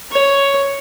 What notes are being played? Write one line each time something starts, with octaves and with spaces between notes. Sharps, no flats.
C#5